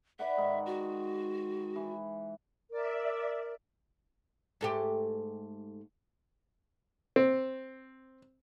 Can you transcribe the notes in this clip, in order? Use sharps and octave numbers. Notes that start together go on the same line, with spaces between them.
B4 D5 E5 F#5
G#2 D#3
F#4
E3
A#4 D5 E5
G#2 A3 G4
C4